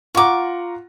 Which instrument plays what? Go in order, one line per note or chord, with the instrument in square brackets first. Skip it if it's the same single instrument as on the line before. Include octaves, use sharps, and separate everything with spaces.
[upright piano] F4 F#5 A#5 [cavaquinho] C#6 D6